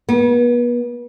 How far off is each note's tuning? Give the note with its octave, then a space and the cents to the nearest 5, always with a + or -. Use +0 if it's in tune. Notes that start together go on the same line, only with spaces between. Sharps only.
B3 -35